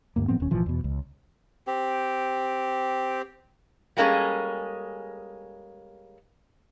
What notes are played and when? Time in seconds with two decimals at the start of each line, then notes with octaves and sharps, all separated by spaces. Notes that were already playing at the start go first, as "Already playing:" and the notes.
0.16 D2 G2 A#3
0.28 A2 F3 B3 C4
0.40 E1 D#2 C#4
0.51 G#1 A#2 E3 F3
0.66 E2 B2
0.84 C#2
1.67 C4 G4
3.97 G3 G#3 A#3 C#4 G#4 A4